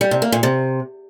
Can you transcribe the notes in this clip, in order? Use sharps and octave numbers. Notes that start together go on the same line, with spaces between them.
G3
C3
A#3
A#2
C3